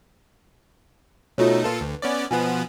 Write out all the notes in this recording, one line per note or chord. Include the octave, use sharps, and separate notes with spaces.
B2 A3 D#4 F4 F#4 C#5
A#2 F4 A4 B4
D2
B3 C#4 D5
B2 F3 B3 G#5